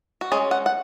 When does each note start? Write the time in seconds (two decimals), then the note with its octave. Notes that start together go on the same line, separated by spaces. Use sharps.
0.21 F#4
0.32 G#3 C#4 G#4
0.51 F#5
0.66 F#5